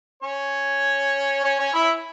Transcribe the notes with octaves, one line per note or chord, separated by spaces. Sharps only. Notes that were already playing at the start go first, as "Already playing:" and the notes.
C#4 C#5
C#4 C#5
C#4 C#5
E4 E5